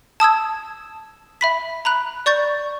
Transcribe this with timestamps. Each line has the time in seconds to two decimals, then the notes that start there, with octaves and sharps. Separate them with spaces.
0.20 A5 D#6 E6 G#6
1.41 E5 B5 B6
1.85 A#5 B5 F#6
2.26 D5 C#6 G6 A6